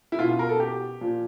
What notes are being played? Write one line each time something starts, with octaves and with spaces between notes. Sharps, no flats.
E4
B2 F4
F4
A#4
A4
G4
A#2 F3